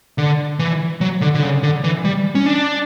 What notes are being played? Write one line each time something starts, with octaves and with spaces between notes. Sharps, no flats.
D3
E3
F#3
D3
D3
C#3
D3
E3
G3
C#4
D4